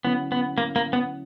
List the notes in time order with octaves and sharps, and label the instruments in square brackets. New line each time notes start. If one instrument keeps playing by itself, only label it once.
[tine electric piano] D3 F#3 A#3 C#4 E4 [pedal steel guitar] B3
[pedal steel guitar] B3
A#3
A#3
B3